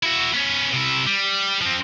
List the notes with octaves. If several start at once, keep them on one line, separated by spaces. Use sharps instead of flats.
E4 F#4
B3 C#4
C3 E4
G3
F3 C4